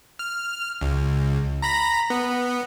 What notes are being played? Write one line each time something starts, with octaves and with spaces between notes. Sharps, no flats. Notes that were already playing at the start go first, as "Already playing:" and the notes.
F6
C#2
A#5 B5 A#6
B3